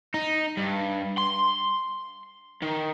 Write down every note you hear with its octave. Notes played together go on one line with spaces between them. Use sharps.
D#4
G2
C6
D#3